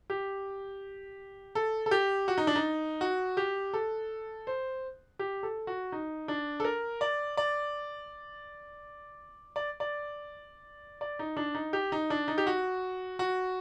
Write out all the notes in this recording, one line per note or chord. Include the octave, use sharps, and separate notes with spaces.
G4
A4
A4
G4
F#4
D#4
D4
D#4
F#4
G4
A4
C5
G4
A4
F#4
D#4
D4
A4
A#4
D5
D5
D5
D5
D5
D#4
D4
D#4
G4
D#4
D4
D#4
G4
F#4
F#4